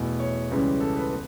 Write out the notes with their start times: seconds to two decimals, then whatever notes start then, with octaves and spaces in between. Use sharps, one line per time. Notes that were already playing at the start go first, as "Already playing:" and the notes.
Already playing: E2 B2 A3
0.20 C#5
0.51 C#2 C#3 E3 G3 C#4
0.81 A4
0.97 B4
1.12 B3